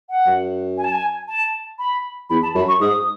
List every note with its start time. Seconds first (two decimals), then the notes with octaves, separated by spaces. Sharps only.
0.10 F#5
0.26 F#2
0.78 G#5
0.84 A5
0.92 G#5
1.28 A5
1.79 B5
2.30 E2 B5
2.43 A5
2.55 F#2 B5
2.68 C#6
2.80 G#2 D#6